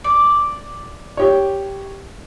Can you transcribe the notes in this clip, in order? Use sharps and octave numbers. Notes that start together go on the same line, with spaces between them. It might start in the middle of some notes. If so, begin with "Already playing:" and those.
D5
G4 C#5